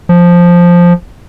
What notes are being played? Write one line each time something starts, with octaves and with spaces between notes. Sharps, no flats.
F3